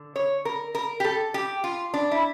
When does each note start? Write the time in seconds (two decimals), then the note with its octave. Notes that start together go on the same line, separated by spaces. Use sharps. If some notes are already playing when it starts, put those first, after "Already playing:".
Already playing: D3
0.16 C#5
0.45 A#4
0.75 A#4
1.00 G4
1.04 A4
1.34 G4
1.64 F4
1.94 D4
2.11 E4